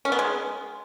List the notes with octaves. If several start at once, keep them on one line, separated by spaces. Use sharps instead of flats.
C#4
B3
G#3